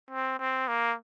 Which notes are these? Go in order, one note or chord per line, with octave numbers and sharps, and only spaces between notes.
C4
C4
A#3